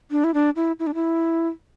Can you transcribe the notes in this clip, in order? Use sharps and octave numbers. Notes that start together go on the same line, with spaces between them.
D4
E4
D4
E4
E4
D4
E4